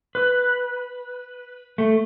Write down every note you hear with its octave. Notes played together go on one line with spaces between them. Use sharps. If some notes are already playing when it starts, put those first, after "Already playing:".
B4
A3